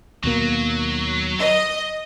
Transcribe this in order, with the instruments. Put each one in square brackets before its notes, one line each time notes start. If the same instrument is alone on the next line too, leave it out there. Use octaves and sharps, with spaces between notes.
[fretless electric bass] D#2 B2 A#3 [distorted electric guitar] F#3
[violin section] D#5